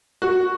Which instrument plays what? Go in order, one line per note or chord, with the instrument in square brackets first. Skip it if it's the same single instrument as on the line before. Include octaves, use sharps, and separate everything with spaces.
[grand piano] F#4